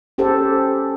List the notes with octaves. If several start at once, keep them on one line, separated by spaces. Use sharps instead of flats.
C#4 G4 A4 C5